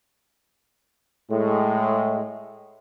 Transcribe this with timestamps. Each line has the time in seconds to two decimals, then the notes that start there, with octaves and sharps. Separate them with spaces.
1.31 A2 G#3